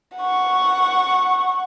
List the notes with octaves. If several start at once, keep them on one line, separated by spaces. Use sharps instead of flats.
F#5 C#6